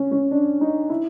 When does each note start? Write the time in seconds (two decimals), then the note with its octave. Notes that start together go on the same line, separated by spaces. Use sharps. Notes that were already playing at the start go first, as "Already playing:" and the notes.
Already playing: C#4
0.12 C#4
0.31 D4
0.61 D#4
0.90 E4